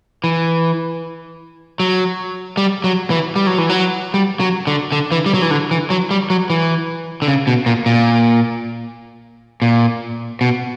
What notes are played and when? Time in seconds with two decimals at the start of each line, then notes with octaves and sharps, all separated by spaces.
0.24 E3
1.80 F#3
2.57 G3
2.84 F#3
3.10 E3
3.36 G3
3.47 F#3
3.58 E3
3.69 F#3
4.14 G3
4.40 F#3
4.67 D3
4.92 D3
5.12 E3
5.26 G3
5.34 F#3
5.42 E3
5.51 D3
5.71 E3
5.90 F#3
6.11 G3
6.30 F#3
6.50 E3
7.22 D3
7.28 C#3
7.47 B2
7.66 A#2
7.86 A#2
9.62 A#2
10.41 B2